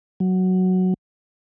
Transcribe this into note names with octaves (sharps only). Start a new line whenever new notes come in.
F#3